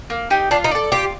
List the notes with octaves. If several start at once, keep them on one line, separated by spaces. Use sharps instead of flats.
A#3
D#4 G4
D4 F4
D#4
A4 D5
F4 G4